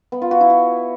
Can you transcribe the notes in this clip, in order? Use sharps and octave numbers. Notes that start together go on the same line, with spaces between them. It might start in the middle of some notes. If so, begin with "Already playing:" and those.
B3
F4
F#4
E4
F#4